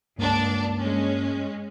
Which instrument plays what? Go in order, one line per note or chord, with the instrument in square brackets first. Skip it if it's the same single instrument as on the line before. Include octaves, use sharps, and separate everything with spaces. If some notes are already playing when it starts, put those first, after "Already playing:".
[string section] C#2 D4 [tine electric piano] G2 A#3
[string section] G#3 C#4